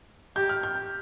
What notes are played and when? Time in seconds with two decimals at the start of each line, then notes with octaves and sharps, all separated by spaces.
0.36 G4 G6
0.49 F6
0.63 G6